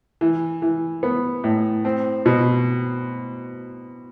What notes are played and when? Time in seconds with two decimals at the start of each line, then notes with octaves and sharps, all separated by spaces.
0.21 E3
0.62 E3
1.03 B3
1.44 A2
1.85 C4
2.26 B2